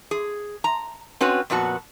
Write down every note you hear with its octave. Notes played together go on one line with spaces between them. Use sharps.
G#4
A#5
C4 C#4 F#4 B4
F2 A#2 B3 F#4 A5